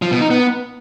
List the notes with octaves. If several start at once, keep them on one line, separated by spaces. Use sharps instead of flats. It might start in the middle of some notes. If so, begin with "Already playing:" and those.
F3
B2
D#4
B3